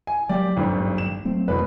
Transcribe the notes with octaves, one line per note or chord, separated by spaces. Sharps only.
G#5
F#3 G#3 A#3 G4 D5
D#1 G#1 G2
E7
F#3 A3 C4
E1 F2 B2 G#3 B3 B4